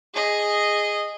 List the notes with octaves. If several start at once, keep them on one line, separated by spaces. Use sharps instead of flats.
G#4 D#5